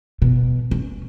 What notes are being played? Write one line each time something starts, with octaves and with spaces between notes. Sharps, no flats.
B2
C#4